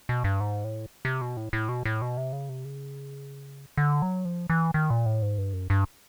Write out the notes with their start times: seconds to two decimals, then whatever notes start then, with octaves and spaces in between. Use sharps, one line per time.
0.09 B2
0.24 G2
0.40 G#2
0.64 A2
1.05 C3
1.21 B2
1.37 A2
1.53 A2
1.69 B2
1.85 A2
2.02 B2
2.17 C3
2.33 C#3
2.49 C3
2.65 C#3
3.77 D3
4.02 F#3
4.25 F3
4.50 E3
4.74 D#3
4.90 A#2
5.06 A2
5.22 G#2
5.38 G2
5.53 F#2
5.70 G2